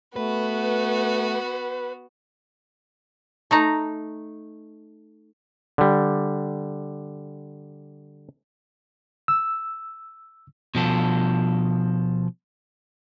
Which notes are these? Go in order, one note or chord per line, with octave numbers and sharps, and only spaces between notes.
A3 B3 F#4 B4
A3 D#4 A#5
D3 G3
E6
B2 F3 A4